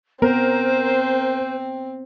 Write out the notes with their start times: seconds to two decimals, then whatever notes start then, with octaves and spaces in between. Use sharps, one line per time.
0.22 B3 C4 A#4 C5